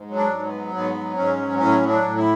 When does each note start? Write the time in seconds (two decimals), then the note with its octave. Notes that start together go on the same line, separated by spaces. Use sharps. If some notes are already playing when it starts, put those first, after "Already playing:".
Already playing: G#2
0.09 F#3
0.16 D4
0.30 G#2
0.45 B3
0.52 F#3
0.73 G#2 B3
0.94 F#3
1.16 G#2 C#4
1.37 F#3
1.58 A2 C#4
1.81 F#3
1.88 D4
2.02 A2
2.16 E4